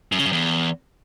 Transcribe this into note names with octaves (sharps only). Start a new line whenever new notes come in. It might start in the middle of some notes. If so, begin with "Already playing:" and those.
F#2
C#3
F#2
E2